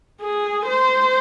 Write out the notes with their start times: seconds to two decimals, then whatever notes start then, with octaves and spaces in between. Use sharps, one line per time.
0.21 G#4
0.67 C5